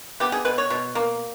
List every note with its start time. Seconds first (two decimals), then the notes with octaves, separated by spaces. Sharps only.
0.20 B3 G4
0.32 G#4
0.45 B2 B4
0.58 C#5
0.70 B2
0.95 A#3